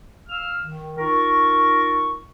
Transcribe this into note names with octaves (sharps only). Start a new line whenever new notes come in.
F5 E6 F6
D#3
D#4 F4 A#4 C#6